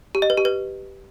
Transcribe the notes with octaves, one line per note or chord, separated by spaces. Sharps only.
G4
D#5
B4
G4
B4